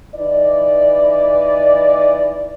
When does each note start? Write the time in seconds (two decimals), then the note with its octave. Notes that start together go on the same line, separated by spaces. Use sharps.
0.14 E3 D#4 D5